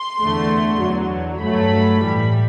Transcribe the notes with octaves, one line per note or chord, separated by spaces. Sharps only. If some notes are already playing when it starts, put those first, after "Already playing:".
Already playing: C6
E2 D3 A3
E2 D3 F#3
G2 F#3 A3 B5
A2 E3 G3